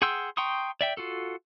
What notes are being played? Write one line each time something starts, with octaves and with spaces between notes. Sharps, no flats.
G#4 F#5 G5 C6 E6
G5 A#5 C6 C#6 D#6
D5 E5 G5
F4 F#4 A4